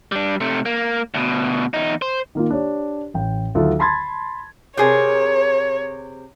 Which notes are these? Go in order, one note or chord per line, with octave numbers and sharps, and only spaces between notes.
G3 D4
C3 A3
A#3
D2 B2
E2 D#4
C5
D#3 A#3 F4
D4 G4 C#5
A1 G5
D2 D3 D#3 F#3 F4 A4
A5 B5 C6 G#6 A6
C3 G#4 A#4 C#5